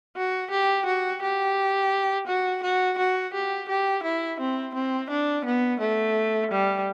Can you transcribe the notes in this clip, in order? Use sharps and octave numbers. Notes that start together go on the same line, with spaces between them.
F#4
G4
F#4
G4
F#4
F#4
F#4
G4
G4
E4
C4
C4
D4
B3
A3
G3